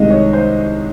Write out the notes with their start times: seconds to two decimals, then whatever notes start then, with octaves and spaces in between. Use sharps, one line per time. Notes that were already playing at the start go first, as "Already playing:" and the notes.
Already playing: C2 C3 D#3 G#3 D#5
0.10 C#5
0.33 C5